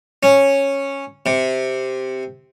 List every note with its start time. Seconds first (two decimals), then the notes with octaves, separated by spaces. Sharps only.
0.23 C#4
1.26 C3